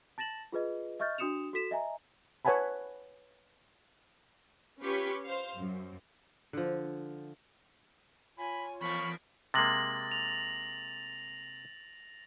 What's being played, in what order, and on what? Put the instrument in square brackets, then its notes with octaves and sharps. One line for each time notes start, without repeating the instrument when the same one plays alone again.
[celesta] A5 A6 A#6 E7 F#7
F4 G#4 B4 D#5
D#5 E5 C#6 F6 G6 A6
D4 F#4 D#6 C#7 E7 F7
F#4 A4 B6 E7
D#5 E5 G#5 A#5
[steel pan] B4 C#5 F#5 G#5 A5 B5
[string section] C#4 F4 G4 B4 C#6 B6
C5 F5
F#2
[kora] D3 F3
[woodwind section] F4 C#5 [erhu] G#5 [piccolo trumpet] B5
[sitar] E2 F3 A#3 [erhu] B5 [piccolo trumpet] C#6
[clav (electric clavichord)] C3 G#3 A#3 [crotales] A6 A#6 F#7
[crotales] F7